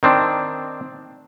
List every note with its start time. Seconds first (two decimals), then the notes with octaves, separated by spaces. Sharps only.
0.03 D#3 C4 D4